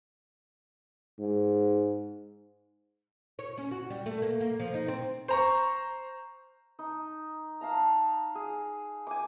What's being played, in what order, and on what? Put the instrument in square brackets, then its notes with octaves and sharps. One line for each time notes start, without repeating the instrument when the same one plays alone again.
[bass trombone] G#2
[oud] C#5
C#4
F#4
G3
A3
A#3
A#3
F3
D#4
C4
[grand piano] C5 A#5 C#6
[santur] D#4
F5 A5 A#5
G#4
G#5 D6